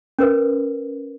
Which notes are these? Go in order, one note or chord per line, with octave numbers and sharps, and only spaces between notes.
C#4 A#4 B4